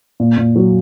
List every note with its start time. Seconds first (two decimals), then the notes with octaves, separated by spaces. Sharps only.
0.20 A#2
0.38 A#2
0.56 F#3